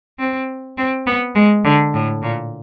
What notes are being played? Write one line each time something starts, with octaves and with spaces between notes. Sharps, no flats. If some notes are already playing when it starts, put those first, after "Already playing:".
C4
C4
B3
G#3
D3
A2
A#2